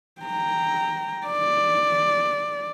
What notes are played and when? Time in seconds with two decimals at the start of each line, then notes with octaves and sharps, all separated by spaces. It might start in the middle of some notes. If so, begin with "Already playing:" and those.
0.21 G5 A#5
1.26 D5